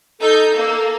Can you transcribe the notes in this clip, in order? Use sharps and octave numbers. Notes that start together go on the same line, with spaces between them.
D#4 A4 G6
A#3